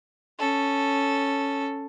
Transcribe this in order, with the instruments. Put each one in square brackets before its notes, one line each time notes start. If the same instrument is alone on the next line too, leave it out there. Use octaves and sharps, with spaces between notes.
[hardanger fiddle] C#4 A4